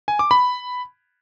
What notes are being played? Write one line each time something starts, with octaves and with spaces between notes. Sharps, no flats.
G#5
D6
B5